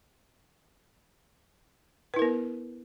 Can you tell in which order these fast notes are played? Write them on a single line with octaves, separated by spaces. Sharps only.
B4 E4 A#4 B3